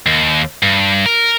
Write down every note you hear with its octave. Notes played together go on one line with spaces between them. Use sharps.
D#2
G2
A#4